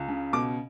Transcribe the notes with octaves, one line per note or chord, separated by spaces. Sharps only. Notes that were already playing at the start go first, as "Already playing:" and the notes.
Already playing: C#2
C#3
B2 D6